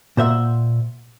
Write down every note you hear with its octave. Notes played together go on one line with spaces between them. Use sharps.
A#2 C5 E5 F#5